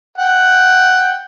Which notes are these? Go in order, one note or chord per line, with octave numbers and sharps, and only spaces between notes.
F#5 G5